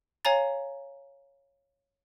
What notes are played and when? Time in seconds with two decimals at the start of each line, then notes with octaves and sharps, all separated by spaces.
0.25 C#5 F5 G#5 A#5 A6